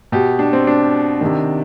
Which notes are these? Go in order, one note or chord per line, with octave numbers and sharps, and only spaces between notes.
B2 G4
D4
C4
D4
C3 D#3